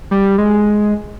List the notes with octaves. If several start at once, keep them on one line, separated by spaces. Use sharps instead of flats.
G3
G#3